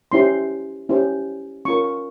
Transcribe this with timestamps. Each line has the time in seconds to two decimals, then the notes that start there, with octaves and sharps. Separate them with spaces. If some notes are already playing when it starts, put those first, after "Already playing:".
0.12 C#4 E4 G4 C5 C6
0.89 C#4 E4 G4 C5
1.65 C#4 F4 A#4 C#6
1.84 C#6